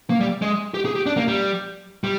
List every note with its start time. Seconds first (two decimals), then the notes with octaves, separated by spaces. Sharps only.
0.10 A#3
0.21 G3
0.42 G#3
0.74 G4
0.85 G#4
0.95 G4
1.06 D4
1.17 A#3
1.28 G3
2.04 G3